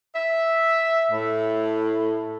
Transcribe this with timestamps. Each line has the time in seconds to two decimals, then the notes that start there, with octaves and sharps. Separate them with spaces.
0.16 E5
1.12 A2